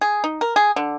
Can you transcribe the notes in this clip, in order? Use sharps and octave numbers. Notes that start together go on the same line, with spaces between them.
G#4
D#4
A#4
G#4
D3